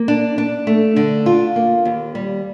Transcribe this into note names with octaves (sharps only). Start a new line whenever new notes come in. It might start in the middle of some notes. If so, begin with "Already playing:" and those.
Already playing: A#3
D4
D4
A3
D3
F4
A#3
D#2
G3